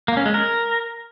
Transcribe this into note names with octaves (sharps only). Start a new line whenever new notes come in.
A#3
C#4
G#3
A#4